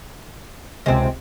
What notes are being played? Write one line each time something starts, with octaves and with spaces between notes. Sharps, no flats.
C#2 C3 G#3 C4